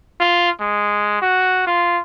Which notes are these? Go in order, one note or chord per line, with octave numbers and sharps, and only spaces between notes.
F4
G#3
F#4
F4